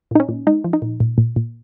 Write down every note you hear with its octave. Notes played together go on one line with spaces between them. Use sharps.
A#2 D#4
C#4
A#2
G#3 D#4
F3
D#4
A#2
A#2
A#2
A#2